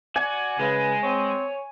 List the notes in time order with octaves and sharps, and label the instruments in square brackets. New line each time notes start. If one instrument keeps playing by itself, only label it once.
[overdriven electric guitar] F#4 [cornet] D5 [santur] G#5
[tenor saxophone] C#3 [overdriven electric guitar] G#3 [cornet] B4
[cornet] C4 [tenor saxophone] C#5